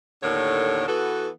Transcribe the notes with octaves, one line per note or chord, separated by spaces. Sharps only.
D#2 A2 D3 A#4 C#5
E3 B3 F#4 A4